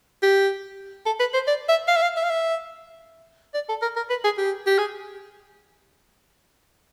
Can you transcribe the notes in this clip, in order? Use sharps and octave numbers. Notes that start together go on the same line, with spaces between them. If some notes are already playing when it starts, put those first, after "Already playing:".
G4
A4
B4
C5
D5
E5
F5
E5
F5
E5
F5
E5
D5
A4
A#4
A#4
B4
G#4
G4
G4
G#4